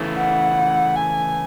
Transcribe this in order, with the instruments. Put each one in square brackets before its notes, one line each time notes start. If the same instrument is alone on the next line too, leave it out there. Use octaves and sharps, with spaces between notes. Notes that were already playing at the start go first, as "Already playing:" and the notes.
Already playing: [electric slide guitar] C#3 E3 A3
[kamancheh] F#5
G#5